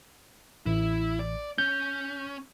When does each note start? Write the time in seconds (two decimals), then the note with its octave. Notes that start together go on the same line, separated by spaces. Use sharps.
0.66 A1 E4
1.19 D5
1.58 C#4 G6